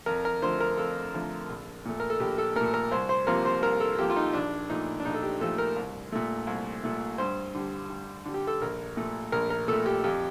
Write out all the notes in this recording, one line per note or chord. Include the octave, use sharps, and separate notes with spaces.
F2 A#4
A#4
D3 F3 A3 C5
A#4
F2 A4
D3 F3 A3
A#1
A#2 A3
A#4
A4
A#1 G4
A4
A#2 A3 A#4
A#4
C2 C5
C5
C3 F3 A#3 A#4
C5
C2 A#4
A4
C3 F3 A#3 G4
F4
D#4
A#1 D4
A#2 F3 A3 D#4
D4
A#1 D#4
A4
G4
A#2 F3 A3 A4
A#4
C2
A#2 A3
C2
A#2 A3
G2 C5
D3 G3
G2
D3 G3
G4
A4
A#1 A#4
A#2 A3
A#1 A#4
A#4
A#2 A3 A4
G4
F2 G4